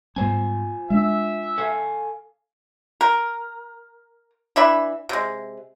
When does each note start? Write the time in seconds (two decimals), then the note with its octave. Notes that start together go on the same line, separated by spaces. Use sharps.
0.16 G#2 G3 B3 F4 C5 G#5
0.90 G#3 D4 E5
1.58 A4 F5 G#5
3.01 A#4
4.56 E3 D4 E5 B5
5.09 C3 G#3